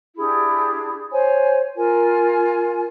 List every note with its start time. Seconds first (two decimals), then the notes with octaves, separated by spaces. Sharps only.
0.17 D4 E4 G4 G#4
1.12 C5 C#5 G#5
1.76 F4 A#4 G#5